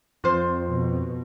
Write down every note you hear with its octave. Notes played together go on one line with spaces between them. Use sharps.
F2 F3 F4 C5
B2